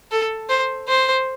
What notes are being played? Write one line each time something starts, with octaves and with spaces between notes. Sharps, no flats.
A4
C5
C5